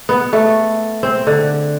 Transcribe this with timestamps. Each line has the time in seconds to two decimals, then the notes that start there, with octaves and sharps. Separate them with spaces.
0.09 B3
0.33 A3
1.03 C4
1.27 D3